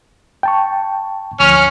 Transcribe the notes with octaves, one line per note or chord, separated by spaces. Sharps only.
G5 A5 C#6
D2 F3 C#4 C#6 F6